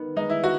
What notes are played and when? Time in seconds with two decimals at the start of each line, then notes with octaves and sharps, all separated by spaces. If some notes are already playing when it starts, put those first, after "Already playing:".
Already playing: D#3 B3
0.16 G#3 D#4
0.30 E4
0.43 D#4 F#4